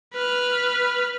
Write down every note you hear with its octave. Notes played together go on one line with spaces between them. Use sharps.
B4 F6